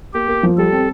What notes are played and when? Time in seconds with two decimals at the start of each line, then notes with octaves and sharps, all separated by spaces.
0.13 A#3 G4
0.28 A#3
0.43 F3
0.58 G3 A4
0.73 C4